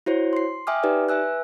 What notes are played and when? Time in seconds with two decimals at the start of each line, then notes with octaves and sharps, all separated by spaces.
0.06 E4 F#4 C5 C#5
0.33 C6 C7
0.67 E5 G5 G#5 D6 D#6 F6
0.83 D#4 G4 B4 D5
1.09 B4 E5 G#5 E6 F#6